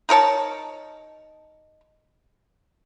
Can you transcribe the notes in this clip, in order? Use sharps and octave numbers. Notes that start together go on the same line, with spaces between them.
D#4 A#4 C#5 A5